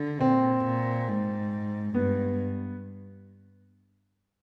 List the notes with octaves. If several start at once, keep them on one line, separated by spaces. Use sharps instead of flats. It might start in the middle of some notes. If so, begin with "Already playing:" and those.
Already playing: D3
A#2 C4
A#2
G#2
G2 B3